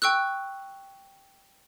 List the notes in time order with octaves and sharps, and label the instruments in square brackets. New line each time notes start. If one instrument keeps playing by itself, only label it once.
[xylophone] G5 C#6 E6 F#6